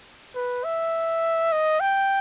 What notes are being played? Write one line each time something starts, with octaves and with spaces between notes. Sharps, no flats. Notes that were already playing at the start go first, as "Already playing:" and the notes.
B4
E5
D#5
G5